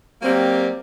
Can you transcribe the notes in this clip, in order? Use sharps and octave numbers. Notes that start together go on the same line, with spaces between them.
F#3 G3 A#3 C4